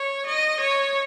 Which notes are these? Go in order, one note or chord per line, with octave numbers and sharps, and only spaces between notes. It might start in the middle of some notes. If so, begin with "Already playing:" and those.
Already playing: C#5
D#5
C#5